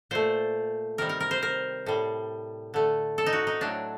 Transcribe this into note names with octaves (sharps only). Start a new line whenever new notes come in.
A#2 A3 C5
C3 D#3 G3 A#4
A#4
A#4
C5
A#4
A2 G3
D3 A3
A4
D#4
F#4
D#4
A2 F#3 A3 D4